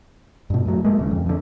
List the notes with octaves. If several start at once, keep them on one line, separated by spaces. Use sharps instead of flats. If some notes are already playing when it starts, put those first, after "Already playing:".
G2 B2
F#2 A2 F#3
G#3 A#3
D1 D#2 C#3
F2
F2 D3